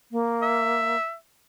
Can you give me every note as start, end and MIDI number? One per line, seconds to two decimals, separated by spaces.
0.12 0.96 58
0.42 1.14 76